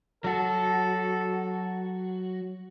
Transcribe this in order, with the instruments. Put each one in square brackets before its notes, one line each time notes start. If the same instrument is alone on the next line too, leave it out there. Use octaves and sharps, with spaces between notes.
[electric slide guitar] F#3 F#4 [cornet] A4